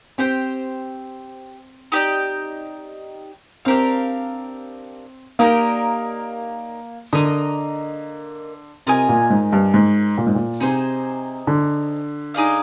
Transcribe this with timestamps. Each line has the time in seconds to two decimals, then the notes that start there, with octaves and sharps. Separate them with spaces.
0.18 C4 G4 C5 G5
1.92 D#4 G4 D5 G5
3.65 C4 D4 G4 A#4 F5
5.39 A#3 D#4 G4 A#4 D5
7.13 D3 A#3 D#4 A#4 D#5
8.87 C3 F4 A#4 D#5 G#5
9.09 A#2
9.30 G#2
9.53 G2
9.74 G#2
10.18 A#2
10.27 G#2
10.35 A#2
10.60 C3 D#4 G#4 C5
11.47 D3
12.34 D#4 G#4 D5 F5